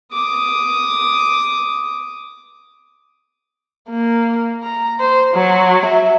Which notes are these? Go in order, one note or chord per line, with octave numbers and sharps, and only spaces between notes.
D6 D#6
A#3
A#5
C5
F#3
E5